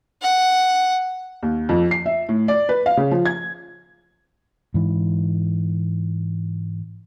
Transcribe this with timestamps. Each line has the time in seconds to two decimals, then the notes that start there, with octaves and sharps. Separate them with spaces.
0.22 F#5
1.43 D#2
1.69 F2
1.91 C7
2.06 E5
2.29 A2
2.48 D5
2.69 B4
2.86 F5
2.97 C#3
3.11 F3
3.26 G#6
4.74 G#2 E3